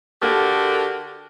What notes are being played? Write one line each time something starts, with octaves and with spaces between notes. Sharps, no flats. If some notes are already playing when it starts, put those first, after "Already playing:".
D3 F#4 G4 A4 A#4